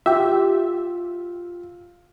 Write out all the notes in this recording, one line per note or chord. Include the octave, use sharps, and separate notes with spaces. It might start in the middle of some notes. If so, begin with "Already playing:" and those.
F4 G4 E5